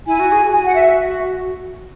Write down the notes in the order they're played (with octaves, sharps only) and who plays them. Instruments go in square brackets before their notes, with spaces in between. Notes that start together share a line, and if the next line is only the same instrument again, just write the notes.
[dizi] E4 [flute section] G#5
[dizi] F#4
G#4
[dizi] G#4 [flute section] G#5
[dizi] F#4
[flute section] G#5
F#5
E5